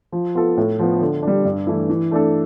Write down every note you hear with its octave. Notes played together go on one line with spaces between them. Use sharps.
F3
B3 F4 A4
A2
F3 B3
D3
G3 D4
G2
E3 A3 E4
E3
A3 D4 A4